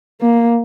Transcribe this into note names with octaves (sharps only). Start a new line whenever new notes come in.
A#3